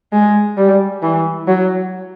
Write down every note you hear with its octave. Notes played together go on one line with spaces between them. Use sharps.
G#3
G3
E3
F#3